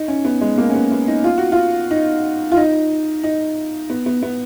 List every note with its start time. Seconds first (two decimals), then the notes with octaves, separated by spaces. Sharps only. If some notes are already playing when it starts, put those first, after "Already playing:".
Already playing: D#4
0.08 C#4
0.25 B3
0.41 G#3
0.58 A#3
0.70 C#4
0.75 B3
0.91 B3
1.08 D#4
1.24 F4
1.38 F#4
1.52 F4
1.91 D#4
2.51 F4
2.57 D#4
3.23 D#4
3.90 B3
4.06 B3
4.23 B3